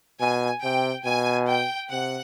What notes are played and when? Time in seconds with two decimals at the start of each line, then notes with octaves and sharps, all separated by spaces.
0.20 B2 G#5
0.63 C3 G5
1.05 B2 G#5
1.48 G5
1.91 C3 F#5